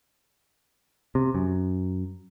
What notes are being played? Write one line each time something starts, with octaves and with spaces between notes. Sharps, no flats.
C3
F#2